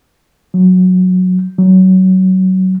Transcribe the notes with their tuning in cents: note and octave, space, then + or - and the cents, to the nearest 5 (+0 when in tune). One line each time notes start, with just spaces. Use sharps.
F#3 -10
F#3 +20